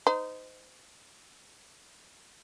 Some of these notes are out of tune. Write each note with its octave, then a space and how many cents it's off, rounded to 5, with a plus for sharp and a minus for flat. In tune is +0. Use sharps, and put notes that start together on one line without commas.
D#4 +0 C5 -30